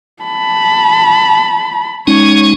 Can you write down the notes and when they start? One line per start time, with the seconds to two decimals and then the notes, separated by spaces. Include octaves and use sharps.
0.23 A5 B5
2.07 G#3 C#4 D#4 C#5